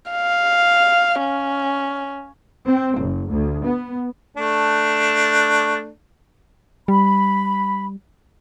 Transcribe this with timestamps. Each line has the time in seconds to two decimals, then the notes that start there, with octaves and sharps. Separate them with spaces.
0.11 F5
1.21 C#4
2.66 C4
3.00 F#1
3.30 D2
3.64 B3
4.37 A3 D4
6.88 G3 B5